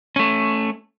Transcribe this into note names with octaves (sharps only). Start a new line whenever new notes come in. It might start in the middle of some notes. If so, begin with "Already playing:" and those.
A3 C#4